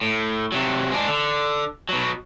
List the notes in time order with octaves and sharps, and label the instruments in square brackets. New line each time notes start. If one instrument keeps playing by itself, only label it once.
[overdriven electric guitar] A2
C3 F#3
G#3 D4
D3
B2 F#3